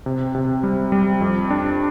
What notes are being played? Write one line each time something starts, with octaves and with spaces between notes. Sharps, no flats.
C3
C3
G3
G3
F2
D4